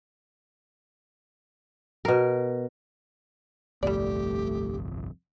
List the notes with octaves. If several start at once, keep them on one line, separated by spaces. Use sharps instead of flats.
B2 A#4
G1 C2 F2 G3 A3 G4 D5